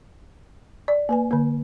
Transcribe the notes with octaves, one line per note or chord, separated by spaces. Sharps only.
D5
A#3 B4 G#5
D3 A#3